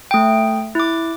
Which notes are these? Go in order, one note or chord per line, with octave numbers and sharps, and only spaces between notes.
A3 G5
E4 D6